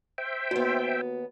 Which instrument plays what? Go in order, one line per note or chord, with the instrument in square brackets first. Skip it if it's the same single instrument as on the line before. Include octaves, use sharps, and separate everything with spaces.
[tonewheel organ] C5 E5 G5
[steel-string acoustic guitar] D#2 B3 [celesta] F#4